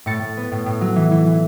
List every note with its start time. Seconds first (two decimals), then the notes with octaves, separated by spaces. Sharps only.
0.06 A2 A6 C#7
0.22 A2
0.37 B3
0.52 A2
0.66 A2
0.81 F#3
0.96 E3
1.11 E3
1.27 E3